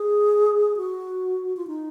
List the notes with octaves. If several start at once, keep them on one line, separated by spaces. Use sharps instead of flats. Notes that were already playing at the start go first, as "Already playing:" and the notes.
Already playing: G#4
F#4
F4
D#4